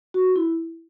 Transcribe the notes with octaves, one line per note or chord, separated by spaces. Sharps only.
F#4
E4